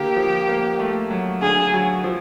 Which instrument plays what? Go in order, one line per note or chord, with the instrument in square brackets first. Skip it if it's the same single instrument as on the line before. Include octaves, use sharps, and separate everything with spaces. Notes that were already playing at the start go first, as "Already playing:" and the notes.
Already playing: [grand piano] D3 A#3 [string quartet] G4
[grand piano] F3
A#3
A3
F#3
[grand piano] D3 [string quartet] G#4
[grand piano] F#3
F3